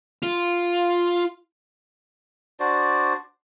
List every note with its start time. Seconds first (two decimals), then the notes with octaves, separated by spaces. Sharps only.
0.23 F4
2.60 D4 F#4 C5 D5